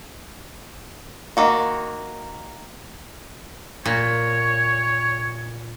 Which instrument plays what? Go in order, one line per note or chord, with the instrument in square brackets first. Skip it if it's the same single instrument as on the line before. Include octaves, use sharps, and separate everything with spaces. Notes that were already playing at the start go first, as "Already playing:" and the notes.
[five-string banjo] D#3 A#3 F#4
[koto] A#2 [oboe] C#5